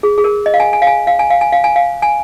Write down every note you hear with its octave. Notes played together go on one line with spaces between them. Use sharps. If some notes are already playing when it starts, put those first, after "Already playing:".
G#4
G#4
A#4
D#5
F5
G#5
G#5
F5
G#5
F5
G#5
F5
G#5
F5
G#5
F5
G#5